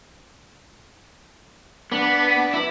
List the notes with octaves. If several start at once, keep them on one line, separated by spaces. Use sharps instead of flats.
B3 D4 B4
E4